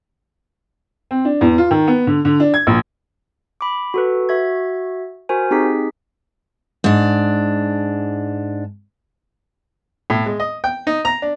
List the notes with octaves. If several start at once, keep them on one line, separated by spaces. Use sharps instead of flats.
C4
D4
E2
F4
D#3
B3
D3
D3
D4
G#6
A#1
B5 D6
F#4 A4 B4
F#4 E5 G#6
F#4 A#4 C5 G#5
C4 D#4 G4 G#4 B6
G#2 D4
A2
G#3
D#5
G5
D#4
A#5
D4